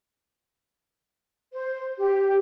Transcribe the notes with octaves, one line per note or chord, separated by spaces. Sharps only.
C5
G4